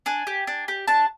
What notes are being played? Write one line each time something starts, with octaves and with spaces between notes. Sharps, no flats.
D4 G#5
G4
D4
G4
D4 A5